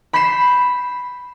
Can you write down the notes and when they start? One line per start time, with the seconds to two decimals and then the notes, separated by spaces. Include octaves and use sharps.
0.13 B5 G6 B6 C7 E7